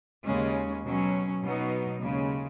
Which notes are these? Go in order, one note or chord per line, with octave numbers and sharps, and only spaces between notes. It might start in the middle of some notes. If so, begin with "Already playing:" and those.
D#2 C#3 G#3 C#4
B2 F#3 C#4
B2 F#3 B3 D#4
D#2 C#3 G#3